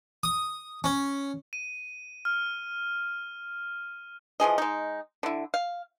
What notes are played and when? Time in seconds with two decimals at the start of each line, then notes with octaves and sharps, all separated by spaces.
0.23 D#6
0.84 C#4
1.53 D#7
2.25 F6
4.40 E3 F3 G#4 D#5
4.58 G#3 D#4
5.23 D3 E4
5.54 F5